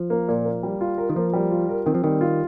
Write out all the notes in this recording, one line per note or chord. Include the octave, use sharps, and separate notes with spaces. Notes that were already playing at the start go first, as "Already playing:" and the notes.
Already playing: F3
A#3
A#2
A#3
G3
F4
A#4
D#3
F3 A#3
G3
F4
A#4
D#3 C4
F3
D#3 G3
F4